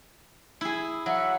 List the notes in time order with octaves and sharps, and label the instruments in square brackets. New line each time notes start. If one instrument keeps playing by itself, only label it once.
[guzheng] E4 G#4
[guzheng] F#3 [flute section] E5 F#5 E6